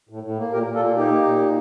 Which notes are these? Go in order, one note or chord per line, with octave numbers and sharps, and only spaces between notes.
A2
A2
A#3
A#2 G4 A#4
A#2
F4 A4
A#3
A#3 D#4 G4
A#3
A#2
A#3